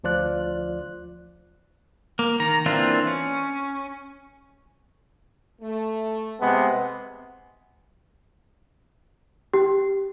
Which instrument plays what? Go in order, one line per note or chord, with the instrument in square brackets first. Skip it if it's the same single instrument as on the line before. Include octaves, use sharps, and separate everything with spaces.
[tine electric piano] D2 F3 F4 D5 F#6
[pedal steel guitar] A#3
D#3 A#5
E3 A#3 C4 D4 F4
C#4
[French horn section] A3
[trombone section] C3 G#3 B3
[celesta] G4